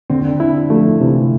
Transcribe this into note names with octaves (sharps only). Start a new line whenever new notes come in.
D3 C4
C4
D4
C4 E4
F3 A3
C3 E3